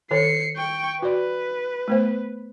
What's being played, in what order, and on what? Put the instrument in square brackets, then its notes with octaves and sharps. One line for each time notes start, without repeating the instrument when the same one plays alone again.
[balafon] D#3 A4 C#5 [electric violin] C7 C#7
[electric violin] G5 C#6
[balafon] F#4 D5 [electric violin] B4
[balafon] A3 B3 C5